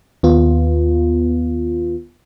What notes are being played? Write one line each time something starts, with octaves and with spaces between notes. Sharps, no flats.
D#2 B3 F4